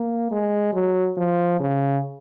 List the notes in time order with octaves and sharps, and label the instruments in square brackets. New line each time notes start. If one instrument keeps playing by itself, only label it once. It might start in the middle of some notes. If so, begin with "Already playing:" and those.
Already playing: [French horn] A#3
G#3
F#3
F3
C#3